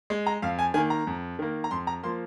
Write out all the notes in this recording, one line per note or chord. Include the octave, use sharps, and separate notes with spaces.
G#3
A#5
F2 F5
G#5
D#3 A#3 G#5
A#5
F2
D#3 A#3
A#5
F2 C6
A#5
F3 A#3 C6